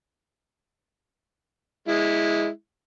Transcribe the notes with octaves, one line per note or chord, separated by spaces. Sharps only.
G#3 E4